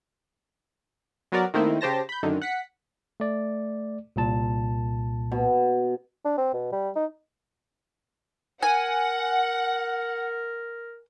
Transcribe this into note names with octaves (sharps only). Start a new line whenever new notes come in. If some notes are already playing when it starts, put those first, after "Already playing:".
F#3 B3 F#4 A#4 D5
D#3 A3 A#3 C4 D#4 E4
C#3 G4 C5 A5 A#6
B5 G6
F#2 D3 D#3
F#5 B6 C#7
A3 D5
C2 A#2 A5
B2
D4
C4
B2
G3
D#4
A#4 F#5 G#5